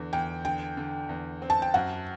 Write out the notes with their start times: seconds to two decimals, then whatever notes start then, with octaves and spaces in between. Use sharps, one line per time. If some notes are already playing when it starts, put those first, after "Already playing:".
Already playing: E2 D3
0.13 E2 G5
0.45 D3 G5
0.77 D3
1.09 E2
1.42 C4
1.50 A5
1.62 G5
1.74 F#2 F#5